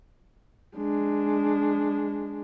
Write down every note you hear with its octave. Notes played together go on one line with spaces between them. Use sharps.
G#3 D4